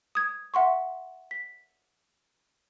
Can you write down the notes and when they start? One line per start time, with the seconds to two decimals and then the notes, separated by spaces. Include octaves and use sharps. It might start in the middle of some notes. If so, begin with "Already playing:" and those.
0.15 D#6 G#6
0.54 E5 F#5 C6 C#6
1.31 B6